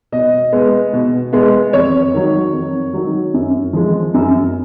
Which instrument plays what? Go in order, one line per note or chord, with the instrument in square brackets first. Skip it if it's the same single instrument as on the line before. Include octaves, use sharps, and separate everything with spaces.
[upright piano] B2 D#5
G#3 B3
B2
G#3 B3
F2 C#5
D#3 F#3
F2
D#3 F#3
F#2
F3 G#3
F#2